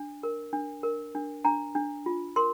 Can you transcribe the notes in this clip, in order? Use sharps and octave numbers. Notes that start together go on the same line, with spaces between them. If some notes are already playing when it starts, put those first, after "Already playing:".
Already playing: D4
A#4
D4
A#4
D4
D4 A#5
D4
F4
A#4 C6